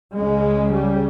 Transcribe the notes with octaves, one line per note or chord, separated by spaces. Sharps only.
C#2 C#3 G#3
G3